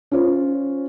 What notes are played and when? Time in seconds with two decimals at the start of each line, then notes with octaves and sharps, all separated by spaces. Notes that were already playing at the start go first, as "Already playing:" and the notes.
0.11 C#4 F4 C5